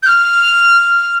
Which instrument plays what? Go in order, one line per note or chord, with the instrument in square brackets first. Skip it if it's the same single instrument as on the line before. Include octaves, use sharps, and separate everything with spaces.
[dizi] G6
F6